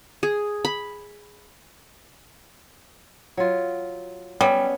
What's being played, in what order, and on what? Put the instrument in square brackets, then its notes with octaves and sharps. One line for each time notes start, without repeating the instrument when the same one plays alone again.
[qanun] G#4
B5
[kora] F#3 F4
[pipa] G3 [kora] B3 C#4 E5